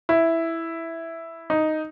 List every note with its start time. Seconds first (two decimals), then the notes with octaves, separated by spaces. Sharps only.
0.09 E4
1.50 D#4